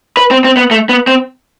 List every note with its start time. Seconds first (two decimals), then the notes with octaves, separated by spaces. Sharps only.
0.17 B4
0.31 C4
0.44 C4
0.57 B3
0.71 A3
0.89 B3
1.07 C4